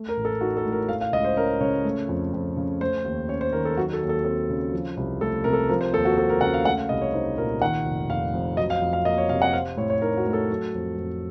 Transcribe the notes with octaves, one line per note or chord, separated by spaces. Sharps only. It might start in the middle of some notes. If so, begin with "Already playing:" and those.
Already playing: A3
A#4
A1
A4
D#4 F#4
A4
A2
A#4
A3 F5
F5
C#2 D#5
C5
C#4 A#4
C#3 C#5
A3
F2
F2
C#3
A3 C5
D#2
C#4 C#5
C5
D#3 A#4
A4
F#3 F#4
A4
D#2
A4
C4 A4
C#3
F3
C2
A3 A4
C3 A#4
A4
F3 A#4
C5
D#2 A4
F#4
C4 A4
A#4
C#3 F#5
F5
A3 F#5
F5
C2 D#5
C#5
D#4 C5
A#2 A#4
D#3 F#5
F1
F1 F5
F2
F#3 D#5
F5
F2
F5
A#3 D#5
C#5
C3 F5
F#5
C4 F5
A2 C#5
C#5
D#4 A#4
F#4
A3
A4
F#3
F2
F2